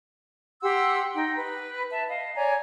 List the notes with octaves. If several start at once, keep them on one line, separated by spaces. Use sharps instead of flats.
G4 F#5 C6 E6
D#4 G5
B4
E5 A5
D#5 F5
C#5 D5 G#5 A#5